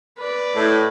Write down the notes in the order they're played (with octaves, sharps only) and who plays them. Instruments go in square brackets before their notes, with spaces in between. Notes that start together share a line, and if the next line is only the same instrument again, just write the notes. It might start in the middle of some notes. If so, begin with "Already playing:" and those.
[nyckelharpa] B4 D5
[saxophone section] A2